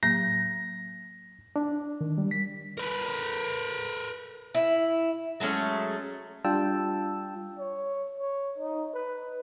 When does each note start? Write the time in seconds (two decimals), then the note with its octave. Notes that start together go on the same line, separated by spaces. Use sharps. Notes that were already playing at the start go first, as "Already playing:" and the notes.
0.03 A2 F#3 A#3 A#6
1.56 D4
2.01 D#3
2.18 G3
2.31 B6
2.78 A#4 B4
4.55 E4
5.40 F#3 G#3 A3 C#4
6.45 G3 D4 F4 G5 A5 E6
7.59 C#5
8.18 C#5
8.58 D#4
8.94 B4